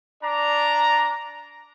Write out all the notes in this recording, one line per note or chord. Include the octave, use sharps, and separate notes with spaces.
D4 D5 A#5